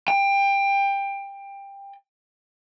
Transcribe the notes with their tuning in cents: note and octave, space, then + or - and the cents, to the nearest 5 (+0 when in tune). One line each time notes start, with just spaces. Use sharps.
G5 +20